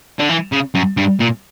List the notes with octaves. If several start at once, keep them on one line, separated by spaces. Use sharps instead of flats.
D3
E3
C#3
F#2
G2
A#2